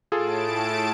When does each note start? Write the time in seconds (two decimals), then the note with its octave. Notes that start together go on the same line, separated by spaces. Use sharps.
0.12 A2 F4 G#4 A4 A5 D7